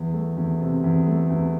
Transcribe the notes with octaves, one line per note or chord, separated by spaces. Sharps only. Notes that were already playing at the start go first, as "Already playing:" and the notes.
Already playing: E2
A3
E2
C3
E2
A3
E2